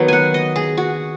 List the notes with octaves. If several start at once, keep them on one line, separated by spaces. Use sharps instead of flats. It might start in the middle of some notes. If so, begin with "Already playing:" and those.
Already playing: D#3 F#3 B3
F#5 G#5
D#5
G#4
F#4